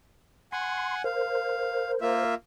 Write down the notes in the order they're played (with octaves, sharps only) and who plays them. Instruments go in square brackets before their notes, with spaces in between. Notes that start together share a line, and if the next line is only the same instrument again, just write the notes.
[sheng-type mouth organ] F#5 G#5 [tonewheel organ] C6
[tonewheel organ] A#4 C5 [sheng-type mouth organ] F5
[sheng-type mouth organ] A#3 F4 E5